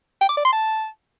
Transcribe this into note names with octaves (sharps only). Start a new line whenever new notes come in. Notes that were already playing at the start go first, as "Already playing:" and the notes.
G5
D6
D5
C6
A5